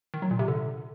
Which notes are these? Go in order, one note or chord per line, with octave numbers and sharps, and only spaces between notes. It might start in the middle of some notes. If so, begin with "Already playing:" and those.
D#3
F#3
A#2
C3
D3